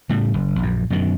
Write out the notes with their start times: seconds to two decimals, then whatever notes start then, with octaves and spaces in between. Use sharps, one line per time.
0.09 A2 C#3 G3
0.34 F#1
0.59 A#1 F#2
0.90 F#2 B2 D3 D#3